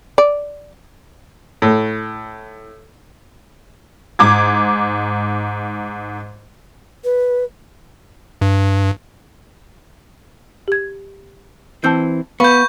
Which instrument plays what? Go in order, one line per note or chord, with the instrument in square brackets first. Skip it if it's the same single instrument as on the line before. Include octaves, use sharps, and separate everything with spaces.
[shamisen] D5
[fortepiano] A2
[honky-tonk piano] G#2 D6 G#6
[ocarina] B4
[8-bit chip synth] G2
[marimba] G4 G#6
[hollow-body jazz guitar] E3 C4 [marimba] A5 E6 G6
[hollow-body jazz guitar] B3 [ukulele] B4 [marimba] F5 [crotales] C#6 G6